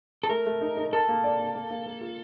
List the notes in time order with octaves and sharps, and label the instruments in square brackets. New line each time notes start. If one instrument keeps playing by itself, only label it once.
[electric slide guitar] A4
[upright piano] A3 [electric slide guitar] A#4
[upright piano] A3
D#4
D#4
[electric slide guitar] A4 [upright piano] A#4
[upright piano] A#3
D5
A#3
A#3
A#3
A#3
F4